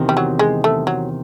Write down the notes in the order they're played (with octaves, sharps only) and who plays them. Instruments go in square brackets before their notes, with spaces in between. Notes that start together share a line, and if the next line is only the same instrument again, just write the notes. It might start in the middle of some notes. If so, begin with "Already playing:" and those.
Already playing: [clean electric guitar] E2 C3 D#3
[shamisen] G3
F#3
G#3
A3
F#3